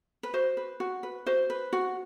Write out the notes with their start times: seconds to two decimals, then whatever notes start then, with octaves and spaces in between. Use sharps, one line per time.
0.23 B4
0.34 F#4 C5
0.57 B4
0.80 F#4
1.03 B4
1.26 F#4 C5
1.50 B4
1.73 F#4